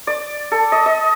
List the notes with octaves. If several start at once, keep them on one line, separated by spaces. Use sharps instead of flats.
D5
A4
D#5
D#5